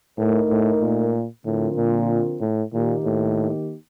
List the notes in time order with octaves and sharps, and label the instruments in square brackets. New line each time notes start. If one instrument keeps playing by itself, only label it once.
[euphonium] A2 [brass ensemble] A3 D#4 A#4
[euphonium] A2
A#2
[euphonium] A2 [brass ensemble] D3 F3 C4 F4 A#4
[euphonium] A#2
A2
[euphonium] A#2 [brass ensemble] D#3 A#3 D#4 G4
[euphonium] A2